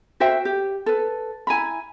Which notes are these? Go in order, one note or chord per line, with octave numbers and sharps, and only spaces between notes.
F#4 C5 E5 G5
G4
A4 B4
E4 G#5 A#5 B5